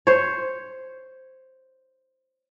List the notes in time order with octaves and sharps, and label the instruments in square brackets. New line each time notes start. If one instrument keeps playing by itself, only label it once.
[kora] C5 C#5